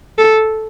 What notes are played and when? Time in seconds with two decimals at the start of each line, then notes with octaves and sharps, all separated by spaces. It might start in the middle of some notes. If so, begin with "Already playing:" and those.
0.18 A4